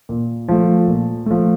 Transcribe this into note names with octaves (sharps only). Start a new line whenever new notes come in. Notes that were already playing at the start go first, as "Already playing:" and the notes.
A#2
F3 A3
A#2
F3 A3